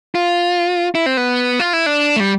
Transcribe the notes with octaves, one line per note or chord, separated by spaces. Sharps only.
F4
E4
C4
B3
F4
E4
D4
A3
G3